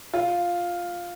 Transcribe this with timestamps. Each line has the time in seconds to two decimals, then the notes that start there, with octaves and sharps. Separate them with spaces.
0.14 F4